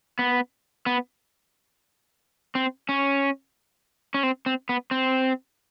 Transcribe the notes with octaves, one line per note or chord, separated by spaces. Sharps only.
B3
B3
C4
C#4
C#4
C4
C4
B3
C4